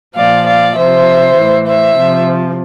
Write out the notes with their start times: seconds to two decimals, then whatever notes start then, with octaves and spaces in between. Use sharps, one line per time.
0.17 A#2 F3 D5 F5
0.46 D5 F5
0.76 C3 F3 C5 E5
1.36 A2 E3
1.66 C5 E5
1.97 C3 F3